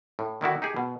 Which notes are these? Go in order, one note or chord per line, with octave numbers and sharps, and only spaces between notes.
A2
D3 D#3 E4 F#4
D#4 G4 G#4
B2